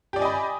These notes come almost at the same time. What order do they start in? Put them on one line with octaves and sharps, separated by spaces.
G4 D5 G#5 D#5 B5